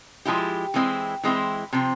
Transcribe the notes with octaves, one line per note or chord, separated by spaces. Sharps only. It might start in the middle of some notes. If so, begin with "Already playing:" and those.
F3 G#3 E4 G4
E3 G#3 C4 E4
E3 G#3 C4 E4
C3 F3 C4